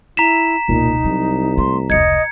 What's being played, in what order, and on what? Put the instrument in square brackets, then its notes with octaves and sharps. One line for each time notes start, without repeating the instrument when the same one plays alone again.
[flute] E4 [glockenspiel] A#5 B6 E7
[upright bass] E1 C#2 [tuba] A#2 [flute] D#4
[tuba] C2 [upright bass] F#3
[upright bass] A3 [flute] C6
[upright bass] F1 C#2 [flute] D#5 [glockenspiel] G#6 C#7